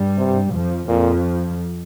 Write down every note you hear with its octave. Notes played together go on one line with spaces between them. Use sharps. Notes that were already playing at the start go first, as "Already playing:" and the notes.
Already playing: G2 G3
C3
F2 F3
F2 A#2 F3